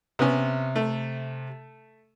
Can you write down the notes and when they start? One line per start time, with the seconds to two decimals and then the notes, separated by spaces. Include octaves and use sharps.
0.19 C3 B3 C#4
0.76 A3